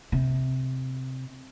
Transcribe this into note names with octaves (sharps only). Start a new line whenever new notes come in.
C3